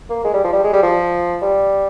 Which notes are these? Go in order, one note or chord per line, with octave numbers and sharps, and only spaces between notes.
A#3
G#3
G3
F3
G3
G#3
G3
F3
G3